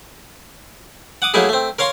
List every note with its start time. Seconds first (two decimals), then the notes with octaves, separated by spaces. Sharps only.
1.22 F#5 D6 D#6
1.34 F#3 A3 A#3 D#4 E4 G#4
1.49 A3 C4
1.79 A#4 C#5 F5 A#5 C6